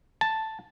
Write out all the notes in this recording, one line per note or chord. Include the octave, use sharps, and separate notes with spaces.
A5